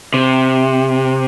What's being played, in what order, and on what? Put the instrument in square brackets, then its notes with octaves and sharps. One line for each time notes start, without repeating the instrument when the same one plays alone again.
[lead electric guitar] C3